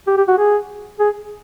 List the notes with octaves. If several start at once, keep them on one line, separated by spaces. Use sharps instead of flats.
G4
G4
F#4
G#4
G#4